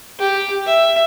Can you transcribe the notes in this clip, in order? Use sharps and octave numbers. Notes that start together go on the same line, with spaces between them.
G4
E5